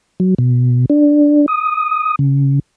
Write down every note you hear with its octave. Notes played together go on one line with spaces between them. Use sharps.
F#3
B2
D4
D#6
C#3